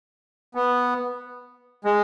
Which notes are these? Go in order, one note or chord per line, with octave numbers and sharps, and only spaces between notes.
B3
G#3